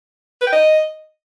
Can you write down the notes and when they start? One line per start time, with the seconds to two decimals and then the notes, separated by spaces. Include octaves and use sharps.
0.42 B4
0.47 G5
0.52 D#5